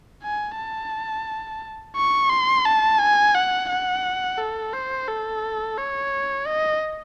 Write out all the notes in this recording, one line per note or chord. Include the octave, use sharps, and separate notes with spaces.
G#5
A5
C#6
C6
A5
G#5
F#5
F#5
A4
C5
A4
C#5
D#5